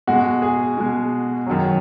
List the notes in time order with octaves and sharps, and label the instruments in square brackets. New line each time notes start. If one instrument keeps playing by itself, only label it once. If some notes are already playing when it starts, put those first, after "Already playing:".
[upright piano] B2 G#3 F#4
G#4
B2 G#3
F#2 D#3 F#3